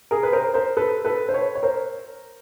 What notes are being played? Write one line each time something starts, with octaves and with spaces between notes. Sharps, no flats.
G#4 A#4
B4
A#4 C5
A#4 C5
A4 B4
A4 B4
C5
B4 C#5
C#5
A#4 C5